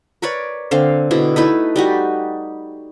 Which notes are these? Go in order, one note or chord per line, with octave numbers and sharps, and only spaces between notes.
A#4 B4 C#5 D5
D3 C4 F5
B2 D3 E4
A3 D#4 E4 B4
G3 D#4 F#4